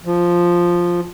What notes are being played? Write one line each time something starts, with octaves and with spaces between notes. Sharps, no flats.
F3